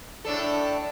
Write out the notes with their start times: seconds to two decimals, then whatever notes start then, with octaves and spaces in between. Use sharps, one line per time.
0.25 A2 D4 A4